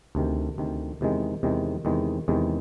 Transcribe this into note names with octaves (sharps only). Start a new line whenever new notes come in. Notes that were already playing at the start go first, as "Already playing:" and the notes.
D2 C3 D#3
D2 C3 D#3
E2 C3 D#3 G#3
E2 C3 D#3 G#3
E2 C3 D#3 G#3
E2 C3 D#3 G#3